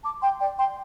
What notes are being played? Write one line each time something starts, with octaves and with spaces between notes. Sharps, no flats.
A5 D6
G5 C6
D5 G5
G5 C6